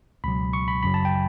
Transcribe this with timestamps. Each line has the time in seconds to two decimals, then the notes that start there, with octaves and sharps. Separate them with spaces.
0.24 C#2 B2 F#3 B5
0.53 C#6
0.68 B5
0.83 G1 F#2 C#3 F#3 B5
0.94 A5
1.05 G5